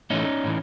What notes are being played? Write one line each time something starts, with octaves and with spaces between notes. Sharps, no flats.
A2 E3 A3 C#4 D#4
A2 E3